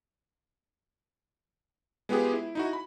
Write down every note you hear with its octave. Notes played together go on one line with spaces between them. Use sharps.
G#3 B3 F4 G4 G#4
E4
D#4 E4 F#4
B5